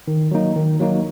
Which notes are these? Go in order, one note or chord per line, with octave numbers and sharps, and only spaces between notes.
D#3
F#3 A#3 D#4
D#3
F#3 A#3 D#4